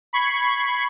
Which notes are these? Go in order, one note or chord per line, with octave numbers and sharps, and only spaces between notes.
B5 C#6 G#6 C7 C#7